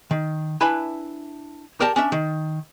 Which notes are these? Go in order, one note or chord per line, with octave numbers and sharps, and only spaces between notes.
D#3
D4 E4 B4 E5 G#5 B5
G4 A#4 D5 G5 A5
C#4 D4 E5
D#3